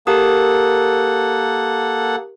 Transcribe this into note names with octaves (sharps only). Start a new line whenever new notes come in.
A#3 G4 A4 A#4 F#5 D#6